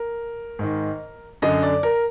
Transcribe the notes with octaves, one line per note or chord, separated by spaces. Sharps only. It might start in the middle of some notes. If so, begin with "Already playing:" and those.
Already playing: A#4
G#2 D#3
F#2 D3 D#5
D5
A#4